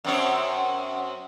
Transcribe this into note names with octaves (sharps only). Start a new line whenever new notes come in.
F#2 C4 C#5